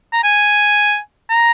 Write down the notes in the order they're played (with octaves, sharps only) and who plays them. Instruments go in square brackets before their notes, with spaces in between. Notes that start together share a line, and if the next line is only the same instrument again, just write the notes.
[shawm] A#5
G#5
A#5